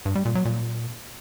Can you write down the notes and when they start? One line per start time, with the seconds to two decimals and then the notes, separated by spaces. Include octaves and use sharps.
0.05 G2
0.15 G3
0.25 A#2
0.35 F#3
0.45 A#2